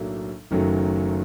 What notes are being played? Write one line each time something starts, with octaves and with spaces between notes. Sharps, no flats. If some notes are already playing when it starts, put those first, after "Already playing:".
Already playing: B1 A2 F#3 A#3 D4
F#1 F#2 D#3 F#3 A3